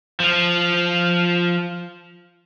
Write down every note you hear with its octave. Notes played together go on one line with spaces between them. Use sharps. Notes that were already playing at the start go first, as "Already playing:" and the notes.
F3 F4